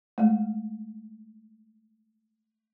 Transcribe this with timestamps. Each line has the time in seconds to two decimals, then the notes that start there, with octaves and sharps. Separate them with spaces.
0.18 G#3 A3